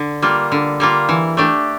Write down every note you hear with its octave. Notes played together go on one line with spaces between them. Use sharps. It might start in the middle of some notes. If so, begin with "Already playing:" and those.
Already playing: D3
G3 A#3 F4
D3
G3 A#3 F4
E3
A3 D4 G4